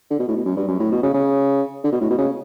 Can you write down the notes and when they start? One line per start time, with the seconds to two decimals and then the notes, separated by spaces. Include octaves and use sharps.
0.10 D3
0.19 B2
0.28 A2
0.36 B2
0.45 F#2
0.57 G2
0.68 F#2
0.79 A2
0.92 B2
1.03 C#3
1.14 C#3
1.84 D3
1.92 B2
2.01 A2
2.10 B2
2.18 C#3